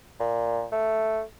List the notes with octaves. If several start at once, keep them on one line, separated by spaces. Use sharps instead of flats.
A#2
A3